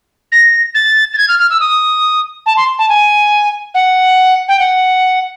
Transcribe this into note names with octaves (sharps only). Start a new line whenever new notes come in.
A#6
A6
A6
G#6
F6
F6
E6
D#6
A5
C6
A5
G#5
F#5
G5
F#5